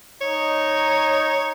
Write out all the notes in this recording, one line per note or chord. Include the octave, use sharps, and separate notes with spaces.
D#4 C#5